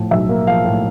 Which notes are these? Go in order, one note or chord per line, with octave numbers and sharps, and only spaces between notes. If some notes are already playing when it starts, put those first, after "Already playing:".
Already playing: A2 F3
B1 E5
A#3
F3 F5
A2